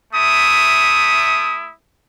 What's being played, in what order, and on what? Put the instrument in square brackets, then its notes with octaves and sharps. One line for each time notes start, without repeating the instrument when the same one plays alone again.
[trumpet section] A3 E4 D#6